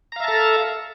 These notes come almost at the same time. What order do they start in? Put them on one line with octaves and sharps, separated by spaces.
A#5 F5 E5 A5 A4